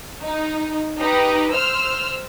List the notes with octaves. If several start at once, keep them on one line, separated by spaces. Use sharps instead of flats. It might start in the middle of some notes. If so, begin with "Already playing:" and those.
D#4
D#4 G4 B4
C5 E6 F6